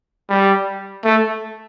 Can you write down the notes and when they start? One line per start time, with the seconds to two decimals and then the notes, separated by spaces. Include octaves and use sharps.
0.29 G3
1.04 A3